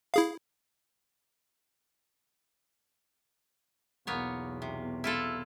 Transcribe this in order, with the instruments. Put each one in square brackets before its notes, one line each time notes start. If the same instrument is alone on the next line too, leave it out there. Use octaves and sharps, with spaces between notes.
[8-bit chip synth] E4 G#4 F5
[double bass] B1 E2 [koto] A#3 B3 C#5
[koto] C3
E4 F4 A4